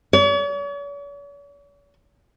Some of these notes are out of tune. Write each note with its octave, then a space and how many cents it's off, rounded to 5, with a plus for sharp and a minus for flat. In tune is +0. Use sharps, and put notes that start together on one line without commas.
C#5 +45